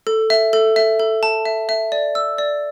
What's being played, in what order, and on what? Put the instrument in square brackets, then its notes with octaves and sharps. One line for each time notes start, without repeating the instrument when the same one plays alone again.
[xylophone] A4
E5
A4
E5
A4
A5
E5
E5
D5
E6
D5